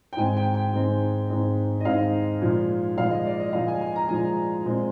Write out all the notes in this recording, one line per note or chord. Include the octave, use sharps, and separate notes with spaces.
G5
G#2 D#3 G#3 C4 G#5
G5
G5
G#2 D#3 G#3 C4
G#2 D#3 G#3 C4
D#5
G#2 D#3 G#3 C4 F5
A#2 F3 G#3
A#2 F3 G#3 F5
D#5
D5
D#5
A#2 F3 G#3 F5
G#5
G#5
A#5
A#2 F3 G#3 G#5
A#2 G#3 C4